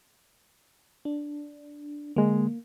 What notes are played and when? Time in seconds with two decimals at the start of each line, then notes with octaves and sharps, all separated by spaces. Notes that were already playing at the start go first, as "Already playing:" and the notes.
1.05 D4
2.16 D3 G#3 A#3